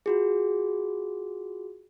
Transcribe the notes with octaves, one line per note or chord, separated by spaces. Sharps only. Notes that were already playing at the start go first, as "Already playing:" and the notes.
F4 F#4 G#4